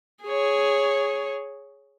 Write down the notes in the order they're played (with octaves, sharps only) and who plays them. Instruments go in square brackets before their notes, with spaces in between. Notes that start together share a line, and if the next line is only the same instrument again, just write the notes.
[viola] G#4 C#5